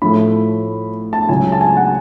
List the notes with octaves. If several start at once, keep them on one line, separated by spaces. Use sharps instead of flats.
A2 F3 A3 B5
A5
C#2 C#3 F#3 G#5
A5
G#5
F#5